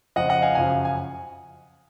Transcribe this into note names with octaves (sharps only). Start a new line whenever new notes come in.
F2 C#3 F3 D#5 F#5
D#5 F#5
F5 G#5
F#2 C#3 F3 F5 G#5
G#5